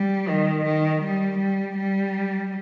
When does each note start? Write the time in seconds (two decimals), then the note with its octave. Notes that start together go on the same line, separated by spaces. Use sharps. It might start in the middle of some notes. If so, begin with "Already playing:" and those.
Already playing: G3
0.28 D#3
0.65 D#3
1.02 G3
1.39 G3
1.77 G3